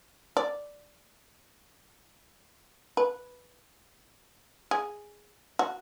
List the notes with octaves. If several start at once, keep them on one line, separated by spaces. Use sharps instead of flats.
D5
B4
G#4
F#4